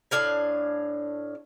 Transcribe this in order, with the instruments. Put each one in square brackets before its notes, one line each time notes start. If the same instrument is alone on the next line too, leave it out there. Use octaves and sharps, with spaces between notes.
[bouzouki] A2 D4 F5 G#5